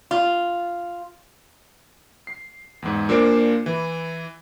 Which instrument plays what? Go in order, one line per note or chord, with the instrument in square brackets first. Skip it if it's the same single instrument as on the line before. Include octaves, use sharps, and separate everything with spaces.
[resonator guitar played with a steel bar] F4
[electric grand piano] C7
E2 G#2
A#2 A#3 D4 C5 D7
E3